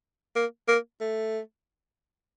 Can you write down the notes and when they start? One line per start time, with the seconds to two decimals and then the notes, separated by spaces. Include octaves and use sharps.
0.36 A#3
0.68 A#3
1.01 A3